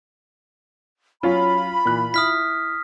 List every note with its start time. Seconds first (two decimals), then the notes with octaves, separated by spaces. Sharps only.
1.23 F#3 C#4 F4 C#5 B5
1.85 A#2 E3 F#6
2.14 E4 D#6 F6 B6